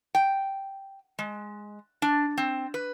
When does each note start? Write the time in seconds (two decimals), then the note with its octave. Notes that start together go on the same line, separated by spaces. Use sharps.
0.15 G5
1.19 G#3
2.02 D4
2.38 C4
2.74 B4